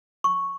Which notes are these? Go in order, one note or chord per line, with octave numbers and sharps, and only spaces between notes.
C#6